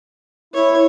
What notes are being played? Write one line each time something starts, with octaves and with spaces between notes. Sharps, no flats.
E4 C#5